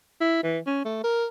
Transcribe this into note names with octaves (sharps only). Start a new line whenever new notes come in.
E4
E3
C#4
A3
A#4